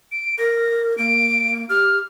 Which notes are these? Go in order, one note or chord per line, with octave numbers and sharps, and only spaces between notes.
D7
A#4 A#6
A#3 D7
G4 F6